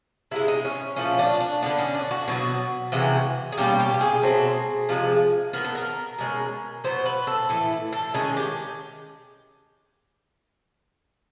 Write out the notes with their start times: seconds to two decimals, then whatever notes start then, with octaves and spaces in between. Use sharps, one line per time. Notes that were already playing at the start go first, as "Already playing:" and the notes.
0.31 C3 F3 G#3 E4
0.48 D#4
0.65 C#4
0.96 A#2 F3 A3 C#4
1.19 D4
1.40 D4
1.62 D3 G3 B3 D4
1.79 C#4
1.95 D4
2.11 F#4
2.28 B2 F#3 B3
2.92 C3 E3 G#3 C#4
3.52 G#4
3.58 B2 G3 A#3 C#4 G4
3.80 G4
3.94 G4
4.01 G#4
4.23 B2 F#3 A3 C4
4.89 C3 F3 G#3
5.53 D#3 F#3 B3 A#4
5.64 A4
5.75 A#4
6.18 B2 G#3 C#4
6.84 B2 F#3 B3 C5
7.06 B4
7.27 A4
7.49 A2 E3 A3 A4
7.92 A4
8.14 D#3 G#3 C#4 G#4
8.37 G4